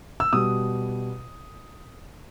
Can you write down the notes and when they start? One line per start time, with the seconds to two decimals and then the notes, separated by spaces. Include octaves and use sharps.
0.20 E6
0.33 B2 G3 D#6